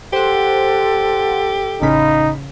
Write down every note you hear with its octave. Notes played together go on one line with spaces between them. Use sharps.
G4 A4 C5 F#5
A1 C#3 D#4 B5